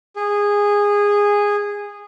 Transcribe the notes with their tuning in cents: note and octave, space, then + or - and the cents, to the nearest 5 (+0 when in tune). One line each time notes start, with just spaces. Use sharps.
G#4 -15